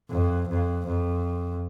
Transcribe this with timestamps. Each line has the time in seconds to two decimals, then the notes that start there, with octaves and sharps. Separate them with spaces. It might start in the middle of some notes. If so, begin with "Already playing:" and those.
0.10 F2
0.48 F2
0.86 F2